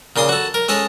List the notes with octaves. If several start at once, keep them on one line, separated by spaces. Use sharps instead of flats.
A#2 C#3 C6 D#6
F#4 A4
A#4
G#3 C#4 A4 D#5